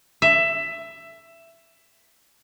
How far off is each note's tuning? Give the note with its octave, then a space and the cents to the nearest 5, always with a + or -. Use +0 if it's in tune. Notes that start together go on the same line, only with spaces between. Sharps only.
E5 +15